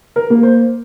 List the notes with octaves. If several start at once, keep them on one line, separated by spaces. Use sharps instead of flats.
A#4
A#3
C5